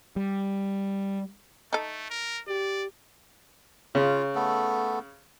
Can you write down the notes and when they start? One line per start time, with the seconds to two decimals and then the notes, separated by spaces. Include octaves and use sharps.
0.16 G3
1.73 A3 D#4 A4
2.10 A#4
2.48 G4 D5
3.95 C#3 F4
4.35 A3 B3 A4